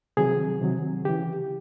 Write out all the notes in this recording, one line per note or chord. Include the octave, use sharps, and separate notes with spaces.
C3 D#3 F#3 G#4
C3 D#3 F#3
C#3 E3 G4